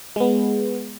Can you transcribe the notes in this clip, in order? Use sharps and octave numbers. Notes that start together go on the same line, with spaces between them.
G#3 B3